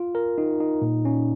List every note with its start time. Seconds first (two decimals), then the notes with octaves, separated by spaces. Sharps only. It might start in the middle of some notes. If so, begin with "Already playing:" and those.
Already playing: F4
0.15 A#4
0.38 D#4
0.60 D#4
0.82 A#2
1.05 C#4